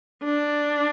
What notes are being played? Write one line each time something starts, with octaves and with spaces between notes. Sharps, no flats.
D4